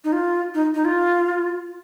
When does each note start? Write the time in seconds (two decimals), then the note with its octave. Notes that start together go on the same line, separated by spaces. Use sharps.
0.04 D#4
0.13 F4
0.54 D#4
0.75 D#4
0.85 F4